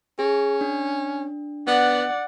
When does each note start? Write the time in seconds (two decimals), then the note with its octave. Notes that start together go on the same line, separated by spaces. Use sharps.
0.19 C#4 G#4
0.61 D4
1.68 B3 D5 F#5